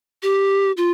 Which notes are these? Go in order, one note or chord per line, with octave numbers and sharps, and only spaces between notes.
G4
F4